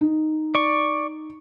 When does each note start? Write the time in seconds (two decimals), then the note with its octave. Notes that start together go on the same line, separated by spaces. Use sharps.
0.01 D#4
0.55 D5 C#6